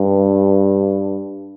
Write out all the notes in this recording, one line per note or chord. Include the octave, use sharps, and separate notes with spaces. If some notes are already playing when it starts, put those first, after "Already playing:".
Already playing: G2